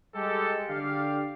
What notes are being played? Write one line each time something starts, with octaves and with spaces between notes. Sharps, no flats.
G3 G#3 G4 A4
D3 G4 D5 F5